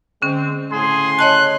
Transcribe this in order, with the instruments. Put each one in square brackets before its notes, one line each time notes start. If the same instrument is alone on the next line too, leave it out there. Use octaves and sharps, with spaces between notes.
[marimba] D3 C#4 [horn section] G#3 C4
[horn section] A2 C#3 C6 [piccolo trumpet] G#4
[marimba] C#5 D#5 A5 [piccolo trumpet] F#6